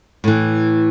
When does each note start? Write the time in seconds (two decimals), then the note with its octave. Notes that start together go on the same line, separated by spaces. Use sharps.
0.24 A2 E3